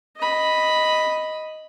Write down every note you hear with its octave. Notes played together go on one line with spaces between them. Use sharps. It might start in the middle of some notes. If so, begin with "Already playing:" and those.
D#5 B5